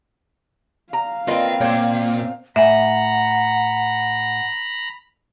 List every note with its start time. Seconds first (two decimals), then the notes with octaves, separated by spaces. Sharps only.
0.93 F5 A#5
1.28 A#3 C4 F4 B4 D#5
1.61 A#2 C5 C#5 G5
2.56 A2 E5 F#5 G#5 A#5 B5